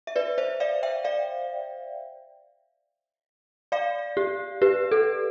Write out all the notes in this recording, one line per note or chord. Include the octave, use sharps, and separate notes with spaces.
E5
B4 D5
C5 E5
D5 F5
E5 G5
D5 F5
D5 F5
G4
G4 B4
A4